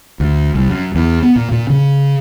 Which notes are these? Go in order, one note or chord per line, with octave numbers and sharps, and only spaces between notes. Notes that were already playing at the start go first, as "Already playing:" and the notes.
D2
C2
F#2
E2
B3
A#2
A#2
C#3